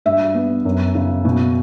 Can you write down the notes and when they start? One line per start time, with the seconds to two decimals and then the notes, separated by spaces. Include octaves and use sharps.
0.06 G2 E5
0.35 B3
0.65 F#2
0.95 C#3
1.25 B2